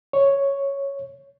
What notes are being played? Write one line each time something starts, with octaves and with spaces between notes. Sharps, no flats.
C#5